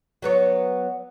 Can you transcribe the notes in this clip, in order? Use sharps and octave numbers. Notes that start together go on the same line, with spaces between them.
F#3 B3 C#5